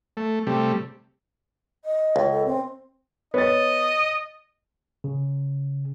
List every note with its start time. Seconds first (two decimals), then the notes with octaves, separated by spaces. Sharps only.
0.17 A3
0.47 C3 G3 A3
1.84 D#5
2.16 C#2
2.31 A4
2.45 C4
3.34 B3 C#5 D#5 A6
5.04 C#3